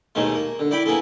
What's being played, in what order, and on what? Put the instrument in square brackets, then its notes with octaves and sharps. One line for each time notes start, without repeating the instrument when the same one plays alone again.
[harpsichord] D#2 B2 D#3 G#3 A3
A#3
D3
E4 D5 G5 B5
A#3 B3 E4 G#4 A4